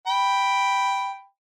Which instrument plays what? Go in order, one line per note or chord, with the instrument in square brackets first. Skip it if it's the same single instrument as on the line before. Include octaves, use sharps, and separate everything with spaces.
[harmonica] G5 B5